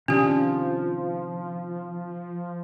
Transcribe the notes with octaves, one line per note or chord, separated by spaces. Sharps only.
C3 D#3 F3 C#4 D4 G4